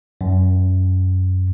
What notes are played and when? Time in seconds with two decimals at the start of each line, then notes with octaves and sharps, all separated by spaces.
0.21 F#2